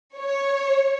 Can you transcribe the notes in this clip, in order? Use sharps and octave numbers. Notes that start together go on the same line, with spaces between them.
C#5